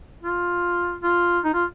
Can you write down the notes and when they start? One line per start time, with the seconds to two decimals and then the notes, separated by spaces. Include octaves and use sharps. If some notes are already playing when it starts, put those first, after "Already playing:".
0.23 F4
1.03 F4
1.44 D#4
1.54 F4